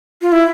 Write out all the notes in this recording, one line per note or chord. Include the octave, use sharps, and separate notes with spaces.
F4
E4